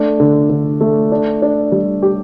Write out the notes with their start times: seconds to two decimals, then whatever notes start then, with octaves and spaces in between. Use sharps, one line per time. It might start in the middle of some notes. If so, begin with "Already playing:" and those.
Already playing: A3 D4
0.20 D3
0.49 D3
0.81 A3
1.12 D4
1.42 D4
1.72 G3
2.02 G4